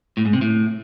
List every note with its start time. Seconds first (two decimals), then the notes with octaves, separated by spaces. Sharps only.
0.17 A2
0.25 G#2
0.33 C3
0.41 A2